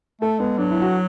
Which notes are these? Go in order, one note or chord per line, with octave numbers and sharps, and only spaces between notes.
A3 A4
G#3 B3
F#3 D4
E4
F#4